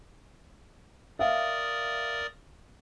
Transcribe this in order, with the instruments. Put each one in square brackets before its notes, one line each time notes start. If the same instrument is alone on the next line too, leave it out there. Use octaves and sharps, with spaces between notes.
[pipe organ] A#4 D5 D#6 [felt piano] E5 F5